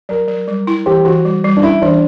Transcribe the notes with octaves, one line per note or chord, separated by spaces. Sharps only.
F#3 A#4
F#3
G3
E4
E3 G4
E3 F#4
G3
G3
D4
C#4 E4
E3 D4